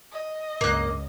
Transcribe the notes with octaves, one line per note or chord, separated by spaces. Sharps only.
D#5
C#2 G2 A#3 F#6